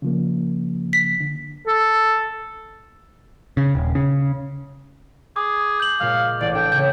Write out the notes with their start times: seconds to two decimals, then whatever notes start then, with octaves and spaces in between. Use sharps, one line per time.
0.02 C#3 F3 A#3
0.93 B6
1.20 D3
1.67 A4
3.57 C#3
3.75 D#1
3.95 C#3
5.36 G#4 D6
5.80 G6 F#7
6.00 A#2 G#3 F5
6.41 A1 D5
6.55 D4 A4 G5
6.72 C#3 C#4 G6